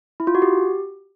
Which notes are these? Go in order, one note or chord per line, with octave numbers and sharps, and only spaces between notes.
E4
F4
F#4
G4